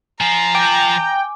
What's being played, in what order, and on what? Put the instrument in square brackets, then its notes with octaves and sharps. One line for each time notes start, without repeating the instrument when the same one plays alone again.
[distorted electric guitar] F3 F4 [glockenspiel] G#5 [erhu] A#5
[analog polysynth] G5 [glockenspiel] D6